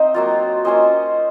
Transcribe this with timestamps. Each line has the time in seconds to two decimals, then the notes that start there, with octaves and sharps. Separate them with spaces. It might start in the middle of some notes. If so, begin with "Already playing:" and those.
Already playing: C4 D#4 C5 D#5
0.14 F#3 A#3 F4
0.65 A#3 C#4 F4 C5 D#5